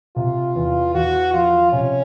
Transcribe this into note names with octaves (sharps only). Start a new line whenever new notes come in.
C3 F4
E2
E2 F#4
F3 F4
C3 C#4